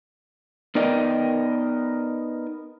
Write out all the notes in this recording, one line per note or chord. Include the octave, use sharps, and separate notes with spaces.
B3 D#4 A#4 D5 D#5 G5